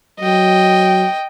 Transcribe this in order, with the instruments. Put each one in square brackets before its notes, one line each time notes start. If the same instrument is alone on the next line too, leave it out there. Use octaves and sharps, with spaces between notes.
[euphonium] F#3 [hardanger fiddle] D#5 G5